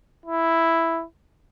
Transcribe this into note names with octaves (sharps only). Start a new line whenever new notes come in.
E4